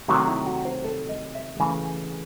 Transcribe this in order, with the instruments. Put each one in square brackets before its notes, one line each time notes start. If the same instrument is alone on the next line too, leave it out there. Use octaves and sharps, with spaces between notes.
[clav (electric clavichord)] C3 D#3 F#3 A3 F#4
E4
F#4
C5
A4
D#5
E5
C#3 E3 A3 G#5
G#5